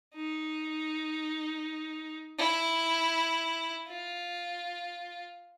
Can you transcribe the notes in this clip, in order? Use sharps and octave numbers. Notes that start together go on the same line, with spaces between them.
D#4
E4
F4